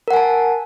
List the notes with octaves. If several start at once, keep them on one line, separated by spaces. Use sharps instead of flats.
A#4 F#5 G#5 A5